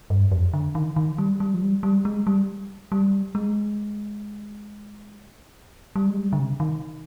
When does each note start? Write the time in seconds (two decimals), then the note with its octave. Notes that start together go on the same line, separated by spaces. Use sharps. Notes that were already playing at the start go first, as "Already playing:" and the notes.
0.10 G2
0.32 F2
0.54 D3
0.75 D#3
0.96 D#3
1.18 G3
1.40 G3
1.54 F3
1.61 G3
1.83 G3
2.05 G#3
2.27 G3
2.92 G3
3.35 G#3
5.96 G3
6.10 G#3
6.17 G3
6.33 D3
6.39 C3
6.60 D#3